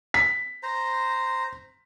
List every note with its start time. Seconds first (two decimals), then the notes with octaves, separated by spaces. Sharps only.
0.14 B6
0.63 C5 A#5